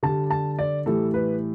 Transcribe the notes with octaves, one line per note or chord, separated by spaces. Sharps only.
D3 G3 A5
A5
D5
A2 E3 G3 A4
B4